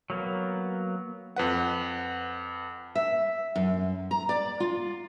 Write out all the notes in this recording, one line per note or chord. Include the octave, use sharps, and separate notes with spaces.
F#3 A#3 B3
F2 B4 F#5
E5
F#2
A#5
D5
F4